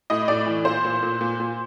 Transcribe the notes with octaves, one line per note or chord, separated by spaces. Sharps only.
A2 D#5
A2 D5
E3
A#2 C5
A#2
A#2
A#2
A#2